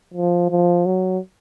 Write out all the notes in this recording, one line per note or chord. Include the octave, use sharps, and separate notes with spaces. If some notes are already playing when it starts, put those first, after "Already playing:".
F3
F3
F#3